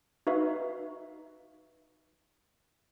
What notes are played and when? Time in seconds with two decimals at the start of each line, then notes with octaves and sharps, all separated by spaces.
0.27 D#4 F#4 B4 E5 F5